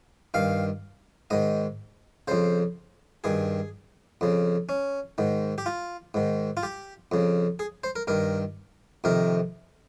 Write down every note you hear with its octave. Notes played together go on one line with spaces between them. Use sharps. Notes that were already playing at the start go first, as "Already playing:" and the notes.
G2 D#3 F5
G#2 D#3 D#5
F2 C#3 C5
G2 D#3 G#4
F2 C#3
C#4
G#2 D#3
G4
F4
G#2 D#3
F4
G4
F2 C#3
G#4
C5
A#4
G2 D#3 A#4
F2 C3 D#3 A#4